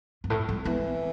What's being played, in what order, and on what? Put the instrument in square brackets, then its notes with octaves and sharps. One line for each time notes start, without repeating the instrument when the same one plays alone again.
[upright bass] G2
A2
G3
[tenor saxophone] E3 [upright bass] B3